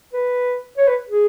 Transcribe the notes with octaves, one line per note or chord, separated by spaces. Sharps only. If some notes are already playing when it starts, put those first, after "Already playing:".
B4
C#5
B4
G#4